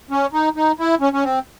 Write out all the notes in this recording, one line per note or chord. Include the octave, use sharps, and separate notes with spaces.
C#4
D#4
D#4
E4
C#4
C#4
C4